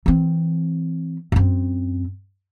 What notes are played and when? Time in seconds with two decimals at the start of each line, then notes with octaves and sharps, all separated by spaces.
0.06 E3 C4
1.32 F#2 C4